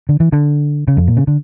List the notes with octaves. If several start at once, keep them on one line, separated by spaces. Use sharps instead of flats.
D3
E3
D3
C#3
F2
A#2
C#3
D3